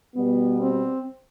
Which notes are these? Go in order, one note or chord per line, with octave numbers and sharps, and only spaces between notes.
B2 G3 B3
C4